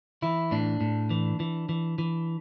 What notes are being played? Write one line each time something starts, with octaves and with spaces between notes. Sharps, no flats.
E3 E4
A2 D4
A2
E3
E3
E3
E3